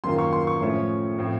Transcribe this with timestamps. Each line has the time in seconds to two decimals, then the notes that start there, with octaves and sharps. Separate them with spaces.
0.04 F#2 D#3 A#3 F4 C6
0.18 C#6
0.33 C6
0.47 C#6
0.61 A2 F3 A3 C#4
1.18 A2 F3 C4